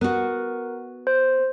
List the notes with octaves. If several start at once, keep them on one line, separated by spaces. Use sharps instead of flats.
B3 F#4 A#4
C5